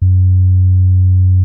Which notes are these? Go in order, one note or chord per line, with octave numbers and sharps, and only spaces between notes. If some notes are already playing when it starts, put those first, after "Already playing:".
F#2